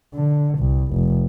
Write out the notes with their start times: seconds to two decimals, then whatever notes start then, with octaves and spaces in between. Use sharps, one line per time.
0.14 D3
0.59 C2
0.92 F1